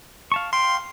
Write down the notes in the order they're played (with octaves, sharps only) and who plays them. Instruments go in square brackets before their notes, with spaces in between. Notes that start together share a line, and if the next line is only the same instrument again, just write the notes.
[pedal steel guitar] F5 A5 C#6
[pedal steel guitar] F5 G5 [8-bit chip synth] C6